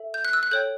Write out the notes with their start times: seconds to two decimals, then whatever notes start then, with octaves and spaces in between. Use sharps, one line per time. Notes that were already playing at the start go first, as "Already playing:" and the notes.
Already playing: A4 E5
0.14 G6
0.25 F#6
0.33 E6
0.43 F#6
0.51 A4 C#5 G5 G6